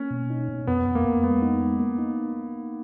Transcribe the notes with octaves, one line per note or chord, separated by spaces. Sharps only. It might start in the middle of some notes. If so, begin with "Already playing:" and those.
Already playing: A#3 C#4
B2
D#4
B2
F2 B3
F2
A#3
F2
G#3 B3
D#4
G#3
A#3
D#4